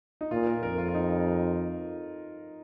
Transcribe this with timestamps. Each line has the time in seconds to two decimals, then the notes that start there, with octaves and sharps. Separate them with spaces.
0.21 D#4
0.31 A#2 F4
0.47 A#4
0.63 F2 A#4
0.78 F4
0.88 F4
0.94 D#4